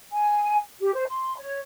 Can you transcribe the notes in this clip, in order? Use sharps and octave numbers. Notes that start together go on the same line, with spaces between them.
G#5
G4
C5
C6
C#5